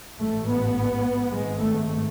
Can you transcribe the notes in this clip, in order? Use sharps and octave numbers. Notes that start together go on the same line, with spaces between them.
A1 G#2 A3
B3
G#1 G#3
G#2
A3